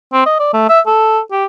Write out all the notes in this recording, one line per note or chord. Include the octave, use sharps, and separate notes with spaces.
C4
D#5
D5
A3
E5
A4
G4